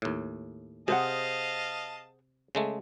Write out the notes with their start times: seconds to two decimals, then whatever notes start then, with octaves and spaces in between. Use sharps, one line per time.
0.02 D#2 A2
0.88 C3 G#4 C5 D#5 F5 F#5 A5
2.55 C#3 G#3 A3